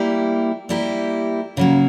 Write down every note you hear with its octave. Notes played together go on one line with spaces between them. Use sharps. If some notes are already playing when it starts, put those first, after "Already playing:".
Already playing: G3 A#3 E4 G4
G3 A#3 E4 G4
C#3 F#3 A#3